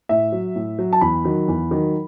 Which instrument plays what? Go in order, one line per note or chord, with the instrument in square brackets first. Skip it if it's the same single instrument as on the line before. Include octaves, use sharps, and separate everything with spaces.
[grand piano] A2 E5
F#3
A2
F#3
A5
E2 B5
D#3 F#3
E2
D#3 F#3